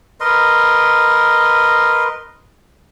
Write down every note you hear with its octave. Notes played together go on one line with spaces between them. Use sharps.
A#4 B4 D#5 C6